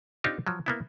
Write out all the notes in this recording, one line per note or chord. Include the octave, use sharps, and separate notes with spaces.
C4 D4 D#4 F4 G4
F3 F#3
A#3 B3 E4